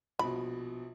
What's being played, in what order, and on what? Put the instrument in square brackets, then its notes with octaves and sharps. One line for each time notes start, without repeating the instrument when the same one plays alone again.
[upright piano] A#1 B2 [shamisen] B5